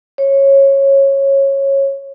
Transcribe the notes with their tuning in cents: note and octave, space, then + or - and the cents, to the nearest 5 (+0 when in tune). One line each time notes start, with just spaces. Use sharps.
C#5 -15